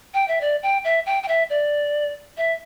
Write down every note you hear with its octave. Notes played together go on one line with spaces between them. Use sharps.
G5
E5
D5
G5
E5
G5
G5
E5
D5
E5